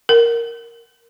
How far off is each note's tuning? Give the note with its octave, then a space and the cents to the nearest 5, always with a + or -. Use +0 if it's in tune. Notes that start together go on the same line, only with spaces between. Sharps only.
A#4 -5